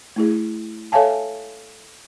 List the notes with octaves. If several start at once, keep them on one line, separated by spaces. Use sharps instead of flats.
A3 E4 G#4
A4 C#5 E5 F5 G#5 A5